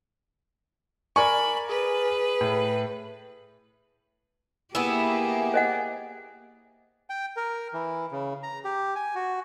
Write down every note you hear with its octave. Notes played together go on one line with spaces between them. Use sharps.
A#4 D5 G#5 B5 C#6
G#4 B4
A2
A#3 B3 E4 G4 G#4
C5 D#5 F#5
G5
A#4
E3
C#3
A#5
G4
G#5
F#4